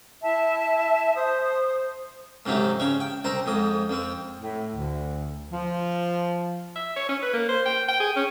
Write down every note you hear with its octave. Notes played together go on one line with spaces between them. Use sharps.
E4 E5 A5
C5 D#6
G#2 C3 F3 F#3 A3
C#3 C#5 C#6
G5
C2 C4 C5 A#5
F2 G#2 D#6
F2 C4
A2
D2
F3
E5
C#5
C#4
B4
A#3
C5
G5
G5
G#4
C#4